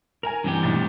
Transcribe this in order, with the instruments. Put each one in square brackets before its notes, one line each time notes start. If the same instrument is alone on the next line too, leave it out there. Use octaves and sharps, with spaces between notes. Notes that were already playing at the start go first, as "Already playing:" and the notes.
[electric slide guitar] A#4 [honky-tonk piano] G#5 A#5 F7
[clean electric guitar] G2 C3 G4 [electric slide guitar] E3
[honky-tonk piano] B1 A2 A6